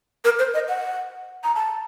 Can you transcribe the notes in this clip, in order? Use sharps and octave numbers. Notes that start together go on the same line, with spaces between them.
A#4
C5
D#5
F#5
A#5
A5